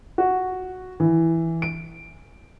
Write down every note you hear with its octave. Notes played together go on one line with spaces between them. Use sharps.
F#4
E3
D7